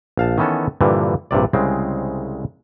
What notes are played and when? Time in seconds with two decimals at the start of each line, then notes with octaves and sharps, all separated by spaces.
0.17 A#1 F5 A5
0.38 D#3 E3 B3 C#4 A4
0.81 G2 A#2 D3 E3 F3
1.31 A#1 G2 C3 D5
1.53 C2 C#3 G#3 C4